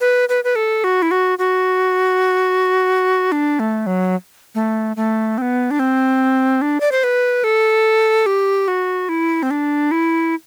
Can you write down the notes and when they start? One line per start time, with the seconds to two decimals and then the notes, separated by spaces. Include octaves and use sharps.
0.01 B4
0.29 B4
0.44 B4
0.56 A4
0.84 F#4
1.02 E4
1.11 F#4
1.39 F#4
3.32 D4
3.60 A3
3.87 F#3
4.55 A3
4.97 A3
5.38 C4
5.42 B3
5.71 D4
5.79 C4
6.62 D4
6.80 D5
6.92 C5
7.04 B4
7.44 A4
8.26 G4
8.68 F#4
9.09 E4
9.43 C4
9.51 D4
9.91 E4